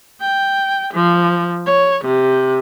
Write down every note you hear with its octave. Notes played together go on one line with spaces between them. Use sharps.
G5
F3
C#5
C3